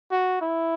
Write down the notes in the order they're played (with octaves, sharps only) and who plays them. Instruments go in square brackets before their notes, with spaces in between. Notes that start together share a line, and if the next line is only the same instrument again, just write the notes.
[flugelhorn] F#4
E4